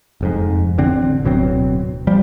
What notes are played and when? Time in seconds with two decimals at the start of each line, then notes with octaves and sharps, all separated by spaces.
0.21 F1 F2 G#2
0.78 A1 D3 C4
1.24 D1 B2 F#3 C4
2.07 F3 G3